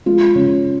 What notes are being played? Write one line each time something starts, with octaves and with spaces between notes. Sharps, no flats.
G#3 F4
C#3